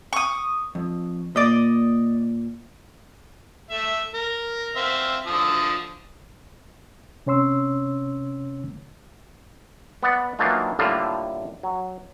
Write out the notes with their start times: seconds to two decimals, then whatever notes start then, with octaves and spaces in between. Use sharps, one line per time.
0.13 C#6 D#6
0.75 F2
1.36 A#2 D5 D#5
3.70 A3 E5
4.14 A#4
4.76 C4 E5 F5
5.26 D3 F3 D#6
7.26 C3 C#4 C#5 C6 E6
10.03 B3 D5 F#5
10.39 E3 F#3 A#3 D4 D#4 F4
10.79 A2 D3 G3 A#3 F4
11.63 F#3